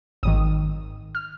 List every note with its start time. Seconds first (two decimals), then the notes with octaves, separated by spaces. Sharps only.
0.23 G#1 G#2 D#3 D#6
1.15 F6